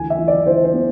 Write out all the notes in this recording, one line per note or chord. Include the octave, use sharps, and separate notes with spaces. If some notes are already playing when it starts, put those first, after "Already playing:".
Already playing: D2 E3 G#5
E5
E3
D5
E3 C5
C5
B3